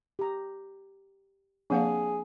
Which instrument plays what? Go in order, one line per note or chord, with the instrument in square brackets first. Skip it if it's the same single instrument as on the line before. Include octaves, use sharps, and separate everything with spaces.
[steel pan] G4 A#5
[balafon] F3 A#3 F5 [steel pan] C4 D4 [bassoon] G#4